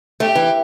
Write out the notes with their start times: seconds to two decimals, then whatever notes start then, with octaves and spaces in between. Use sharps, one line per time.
0.20 A3 G4
0.35 E3